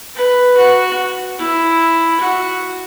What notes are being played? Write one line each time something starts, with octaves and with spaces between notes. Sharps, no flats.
B4
F#4
E4
F#4